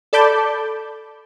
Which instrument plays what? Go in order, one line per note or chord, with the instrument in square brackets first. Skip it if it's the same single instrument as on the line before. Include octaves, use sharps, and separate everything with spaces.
[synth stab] A4 D5 A5 B5 D6 G6